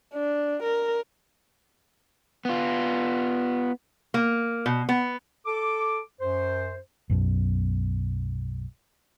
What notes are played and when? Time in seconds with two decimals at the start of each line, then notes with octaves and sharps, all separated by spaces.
0.14 D4
0.63 A#4
2.45 B3 F4
4.14 A#3
4.66 B2
4.89 B3
5.46 A4 D6
6.21 F#2 C5
7.10 B1 F#2 B2